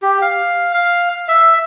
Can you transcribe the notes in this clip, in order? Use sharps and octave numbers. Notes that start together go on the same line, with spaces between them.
G4
F5
F5
E5